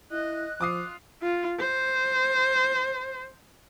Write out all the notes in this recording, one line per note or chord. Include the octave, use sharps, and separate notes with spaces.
E4 D#5 F#6
F3 F4 D6 D#6 C7
F4
C5